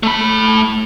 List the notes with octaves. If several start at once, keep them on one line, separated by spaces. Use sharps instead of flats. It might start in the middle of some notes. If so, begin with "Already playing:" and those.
A3 B5